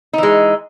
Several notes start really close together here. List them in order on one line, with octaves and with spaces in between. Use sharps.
D#4 E3 G#3